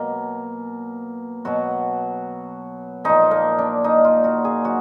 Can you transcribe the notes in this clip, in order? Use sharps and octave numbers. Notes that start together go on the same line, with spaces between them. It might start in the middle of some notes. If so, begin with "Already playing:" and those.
Already playing: B2 F#3 A#3
B2 F#3 F#4
A#2 F3 D#4
A#3
D4
D#4
F4
F#4
G#4
F#3 F#4